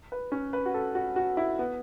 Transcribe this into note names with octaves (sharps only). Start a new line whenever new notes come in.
B4
C#4
B4
F#4
A4
F#4
F#4
E4
B3